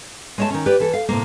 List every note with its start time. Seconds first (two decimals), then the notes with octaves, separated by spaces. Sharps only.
0.38 G#3 A3 C#5 E5 A5
0.50 D#3 C#4
0.66 G4 B4 D5
0.80 E3 A4
0.93 F5
1.09 A2 C3 G#3 A#3